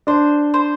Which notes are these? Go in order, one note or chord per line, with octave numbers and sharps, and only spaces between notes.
D4 C5
C5